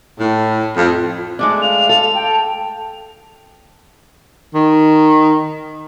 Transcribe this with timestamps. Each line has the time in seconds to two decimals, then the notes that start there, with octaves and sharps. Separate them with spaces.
0.20 A2
0.77 F2
1.39 G#3 A3 D4 D6
1.62 F5 F7
1.89 A4
2.15 G5 A5
4.55 D#3